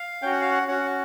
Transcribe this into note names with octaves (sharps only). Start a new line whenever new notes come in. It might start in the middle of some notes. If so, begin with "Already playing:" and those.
Already playing: F5
C#4 F#4 G5
F#5
F5
F#5
C#4 F#4 F#5